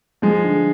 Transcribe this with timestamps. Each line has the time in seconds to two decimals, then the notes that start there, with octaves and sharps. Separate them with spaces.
0.22 F3 G#3
0.44 D3